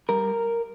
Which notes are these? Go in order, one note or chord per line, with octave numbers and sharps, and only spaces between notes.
G3 A#4